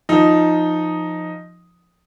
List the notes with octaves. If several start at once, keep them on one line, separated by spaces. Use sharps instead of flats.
F3 D#4